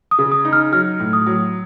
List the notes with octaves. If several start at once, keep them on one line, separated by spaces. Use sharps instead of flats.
D#6
C#3
D#6
D#4
F6
F#3 F6
A2
D#6
F#3